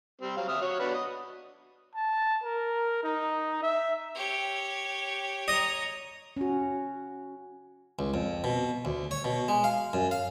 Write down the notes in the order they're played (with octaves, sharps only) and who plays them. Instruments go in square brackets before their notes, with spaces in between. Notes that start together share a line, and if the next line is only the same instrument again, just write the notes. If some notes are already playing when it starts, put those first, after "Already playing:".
[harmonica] G3 C4
F#3 F5
E5 D#6 F6
F#4 C#5
D4 F#4 B4
D#5
[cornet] A5
A#4
D#4
E5
[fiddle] G4 C#5
[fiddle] C#5 A#5 [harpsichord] D#5
[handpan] C#4 F#4
[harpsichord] C#2
F2
B2
D2
C#5
B2
G#3
F5
F#2
F5